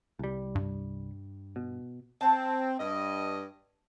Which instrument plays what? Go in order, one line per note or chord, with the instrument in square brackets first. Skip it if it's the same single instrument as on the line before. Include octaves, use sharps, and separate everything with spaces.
[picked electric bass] C2 G3
[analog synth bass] G2
[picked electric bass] B2
[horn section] C4 [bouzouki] A5
[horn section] G2 D#5